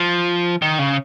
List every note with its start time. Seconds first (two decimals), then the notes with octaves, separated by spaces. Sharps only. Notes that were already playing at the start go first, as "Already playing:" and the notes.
Already playing: F3
0.62 D#3
0.79 C#3